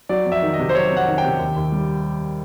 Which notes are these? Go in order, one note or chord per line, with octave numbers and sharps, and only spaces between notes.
F#3 D5
F2
E5
D#3
D#5
C3
C5
F#3 C#5
F2
F#5
D#3
G5
C3
D#2
D#2
G3